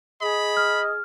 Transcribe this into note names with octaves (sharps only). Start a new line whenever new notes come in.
G#4 D#5 B5
F6